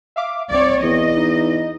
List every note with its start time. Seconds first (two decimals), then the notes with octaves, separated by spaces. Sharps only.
0.16 E5 F5 D6
0.50 C2 C4 C#5 D5
0.83 E2 D#5
1.17 D#4